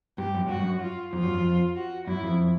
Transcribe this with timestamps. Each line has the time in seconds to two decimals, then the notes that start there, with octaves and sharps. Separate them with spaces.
0.18 G2 G4
0.34 F#2
0.47 G2 F#4
0.59 F#2
0.81 F4
1.13 F2 F4
1.23 F#2
1.34 F2
1.76 F#4
2.07 F#2 E4
2.23 F2